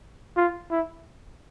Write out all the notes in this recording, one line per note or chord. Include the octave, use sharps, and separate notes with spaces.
F4
E4